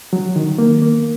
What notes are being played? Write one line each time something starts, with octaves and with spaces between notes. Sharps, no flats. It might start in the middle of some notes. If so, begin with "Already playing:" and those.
F#3
D#3
A#3
A#3